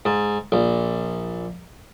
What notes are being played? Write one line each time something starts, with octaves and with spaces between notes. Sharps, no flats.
G#2
A#1